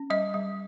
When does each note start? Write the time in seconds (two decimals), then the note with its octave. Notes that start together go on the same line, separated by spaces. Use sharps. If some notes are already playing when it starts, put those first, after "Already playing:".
Already playing: C#4
0.10 G3 D#5
0.34 G3